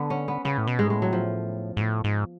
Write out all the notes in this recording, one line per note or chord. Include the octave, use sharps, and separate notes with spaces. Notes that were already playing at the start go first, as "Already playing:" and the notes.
Already playing: D3 B3
C#4
B3
C#3 B3
A2
B2
G#2 G#3
A2 G#3
F#3
F3
G#2
A2
G#2